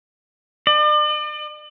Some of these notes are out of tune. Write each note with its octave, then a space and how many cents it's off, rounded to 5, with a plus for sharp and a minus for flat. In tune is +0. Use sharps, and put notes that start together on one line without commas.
D5 +40